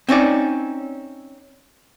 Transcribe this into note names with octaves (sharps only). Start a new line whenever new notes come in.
C4 C#4 D#4 D5